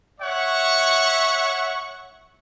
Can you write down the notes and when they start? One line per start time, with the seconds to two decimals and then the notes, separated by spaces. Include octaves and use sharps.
0.21 C#5 E5 F#5 C#6